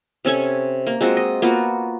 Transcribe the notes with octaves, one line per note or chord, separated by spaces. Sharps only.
C3 C#4 A4 G#5
A#3
G#3 C4 F4 F#4
D#5
A#3 B3 F4 F#4